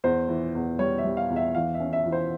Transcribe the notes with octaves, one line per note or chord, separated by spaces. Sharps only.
E2 C5
E3
E2
G3 C#5
E5
G3
F5
E2
E5
E3 F5
E5
C#4
E5
E3
C5